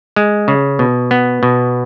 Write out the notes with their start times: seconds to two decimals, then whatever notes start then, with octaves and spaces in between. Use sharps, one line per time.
0.16 G#3
0.48 C#3
0.79 B2
1.11 B3
1.43 B2